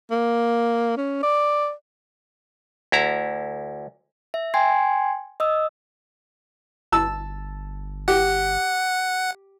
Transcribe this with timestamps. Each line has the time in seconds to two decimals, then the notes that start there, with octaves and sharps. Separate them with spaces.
0.11 A#3
0.97 C#4
1.23 D5
2.92 D2 E4 A#5
4.34 E5
4.54 G5 G#5 C6 G#6 C7
5.40 D#5 D#6 E6
6.92 G1 A5 E6
8.08 G4 F#5